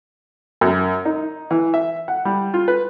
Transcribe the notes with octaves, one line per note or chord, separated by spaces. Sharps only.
F#2
D#4
E3
E5
F#5
G3
F4
B4